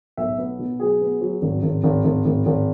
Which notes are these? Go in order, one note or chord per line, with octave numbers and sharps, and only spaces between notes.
B1 E5
B3
B2
F#3 G#4
B3
F#3
G#1
G#1
G#1
G#1
G#1
G#1